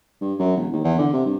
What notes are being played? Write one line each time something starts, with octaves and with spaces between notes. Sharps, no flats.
G2
F#2
E1
D#2
E2
D3
C3
G2